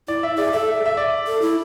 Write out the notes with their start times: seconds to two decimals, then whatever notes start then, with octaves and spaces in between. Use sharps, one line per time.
0.08 E4 D5
0.23 E5
0.38 G#4 D5
0.53 A4 E5
0.86 E5
0.97 D5
1.27 A4
1.42 E4